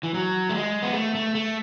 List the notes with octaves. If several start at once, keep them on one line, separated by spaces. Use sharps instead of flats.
E3
F#3
A3
G#3
B3
A3
A3
A3